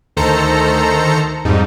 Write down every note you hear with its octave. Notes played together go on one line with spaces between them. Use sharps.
D2 D#3 A4 C5 A#5 C#7
F2 G#2 G3 D#4